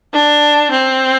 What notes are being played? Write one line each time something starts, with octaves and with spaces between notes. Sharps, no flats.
D4
C4